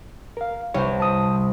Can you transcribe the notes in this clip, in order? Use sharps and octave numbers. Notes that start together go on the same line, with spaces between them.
A#4 F5
C2 C5 C#5
A5 D#6